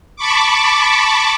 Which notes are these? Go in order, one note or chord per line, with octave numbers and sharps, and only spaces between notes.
A5 B5 C#6 D6